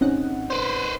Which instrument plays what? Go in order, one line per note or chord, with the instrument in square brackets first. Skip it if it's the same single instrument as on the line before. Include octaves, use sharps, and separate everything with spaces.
[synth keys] G#1 D#4 F#5 [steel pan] C4 C#4
[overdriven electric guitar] B4 C5